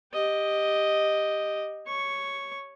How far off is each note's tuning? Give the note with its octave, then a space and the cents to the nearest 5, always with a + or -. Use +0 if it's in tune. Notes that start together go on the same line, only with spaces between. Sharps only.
G4 +5 D#5 +0
C#5 +0 C#6 +0